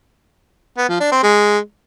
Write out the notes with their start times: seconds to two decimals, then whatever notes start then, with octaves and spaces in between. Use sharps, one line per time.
0.77 B3
0.89 F3
1.00 D4
1.12 C4
1.23 G#3